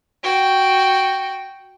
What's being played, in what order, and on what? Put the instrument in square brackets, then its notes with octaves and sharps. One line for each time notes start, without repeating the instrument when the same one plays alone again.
[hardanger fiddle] F#4 G5